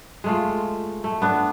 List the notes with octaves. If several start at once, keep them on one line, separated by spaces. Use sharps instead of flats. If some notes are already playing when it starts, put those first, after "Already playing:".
G#3 A3 F4
A3
B3 D4